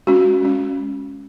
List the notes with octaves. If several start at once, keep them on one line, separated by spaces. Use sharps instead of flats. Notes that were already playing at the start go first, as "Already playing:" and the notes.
G#3 C#4 F#4
G#3 C#4